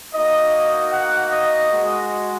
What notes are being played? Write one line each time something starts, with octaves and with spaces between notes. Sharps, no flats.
A#3 D#4 F#4 D#5
F#5
D#5
G#3 F#4